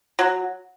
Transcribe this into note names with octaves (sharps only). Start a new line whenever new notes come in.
F#3